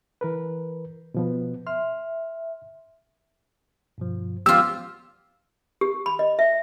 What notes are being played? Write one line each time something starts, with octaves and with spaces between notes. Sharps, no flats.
E3 A#4 B4
B2 F3 B3
E5 C6 F6
G2 B2 F3
F3 G#3 B3 F4 G4 E6
G4
B5
D#5
E5